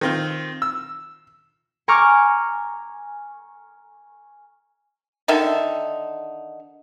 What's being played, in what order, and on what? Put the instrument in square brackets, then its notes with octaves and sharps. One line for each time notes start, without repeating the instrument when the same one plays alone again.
[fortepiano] D#3 C4 F4
E6
[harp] G#5 A#5 C#6 D6 F6 G#6
[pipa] D3 D#3 D#4 E5